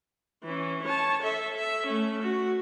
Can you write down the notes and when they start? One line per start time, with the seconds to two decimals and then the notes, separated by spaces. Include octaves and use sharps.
0.44 E3 C#4
0.83 C#5 A5
1.22 A4 E5
1.56 E5
1.86 A3 C#4
2.22 F#4